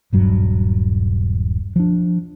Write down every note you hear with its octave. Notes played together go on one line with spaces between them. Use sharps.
D#1 G2 F#3
F3 D4